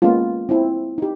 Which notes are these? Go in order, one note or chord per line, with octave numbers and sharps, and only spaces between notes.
G#3 A#3 B3 C#4 F4
C4 E4
D#4 G4